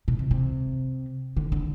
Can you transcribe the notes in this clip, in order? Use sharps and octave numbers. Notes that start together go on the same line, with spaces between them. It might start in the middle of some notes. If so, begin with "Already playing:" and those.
B2
C3
C3
D3
D3